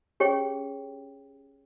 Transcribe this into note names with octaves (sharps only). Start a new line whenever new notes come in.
C#4 G4 G#4 C#5 G5